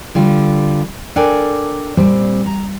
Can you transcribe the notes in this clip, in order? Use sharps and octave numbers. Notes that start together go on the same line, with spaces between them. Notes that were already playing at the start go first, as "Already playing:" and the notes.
D3 G3 F4
D4 A4 A#4 D5 G5 G#5
A#2 G3 C4
A#5